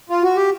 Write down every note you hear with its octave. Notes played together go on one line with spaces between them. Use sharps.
F4
F#4
G4